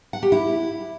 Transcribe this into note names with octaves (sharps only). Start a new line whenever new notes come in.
F#5
G4
E4